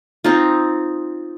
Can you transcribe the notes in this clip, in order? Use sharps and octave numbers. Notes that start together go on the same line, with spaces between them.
C4 D#4 F4